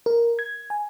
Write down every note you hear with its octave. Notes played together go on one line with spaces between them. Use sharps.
A#4
G#6
G#5